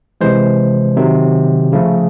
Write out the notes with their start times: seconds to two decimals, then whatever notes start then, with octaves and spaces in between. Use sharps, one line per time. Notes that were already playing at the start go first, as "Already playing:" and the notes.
0.21 C3 E3 G#3 C5
0.96 C3 D#3 F#3
1.72 C#3 F3 A3